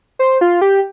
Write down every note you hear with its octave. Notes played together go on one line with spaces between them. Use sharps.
C5
F4
G4